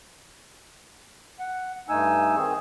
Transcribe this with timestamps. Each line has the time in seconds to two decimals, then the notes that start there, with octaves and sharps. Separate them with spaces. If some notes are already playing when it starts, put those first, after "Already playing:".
1.39 F#5
1.89 G2 A3 D#4 G#5 E6
2.36 D#3 C4 G#4